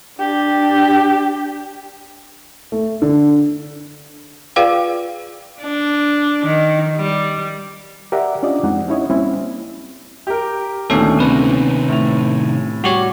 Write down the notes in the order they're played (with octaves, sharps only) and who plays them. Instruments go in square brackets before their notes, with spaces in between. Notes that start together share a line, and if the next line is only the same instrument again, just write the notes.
[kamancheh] D4 G4
[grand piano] A3
D3
[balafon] F4 G#4 B4 D5 F5 G5
[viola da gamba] D4
D#3
G3
[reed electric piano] G4 A#4 D5 E5 F#5
C#4 D4 F4 D5 D#5
F2 G#3 C4 D#4 F#5
C#4 D#4 E4 C#5 D#5
G3 A#3 C4 C#4 E4
[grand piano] G4 A#4
[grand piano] D2 A#2 [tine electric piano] D#3 C#4 A4 [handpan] B3 D4
[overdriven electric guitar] C3 D#3 [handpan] C4 C#4 [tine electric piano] B4
[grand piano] A2 F7
[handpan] G3 [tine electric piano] F#4 G4 C#5